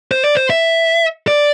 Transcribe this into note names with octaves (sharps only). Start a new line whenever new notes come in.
C5
D5
C5
E5
D5